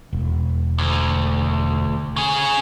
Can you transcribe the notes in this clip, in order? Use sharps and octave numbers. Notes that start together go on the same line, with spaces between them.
E1
D2
C#3 G#4